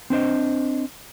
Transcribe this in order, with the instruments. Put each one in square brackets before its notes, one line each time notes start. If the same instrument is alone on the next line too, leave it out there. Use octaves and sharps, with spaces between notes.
[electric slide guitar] C4 D4 C5 D#5